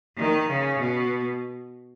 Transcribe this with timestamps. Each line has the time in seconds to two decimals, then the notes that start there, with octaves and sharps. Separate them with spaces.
0.17 D#3
0.49 C#3
0.79 B2